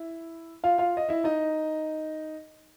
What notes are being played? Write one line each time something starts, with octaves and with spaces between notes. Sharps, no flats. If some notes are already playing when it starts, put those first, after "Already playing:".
Already playing: E4
F4 F5
F4 F5
D#5
E4 E5
D#4 D#5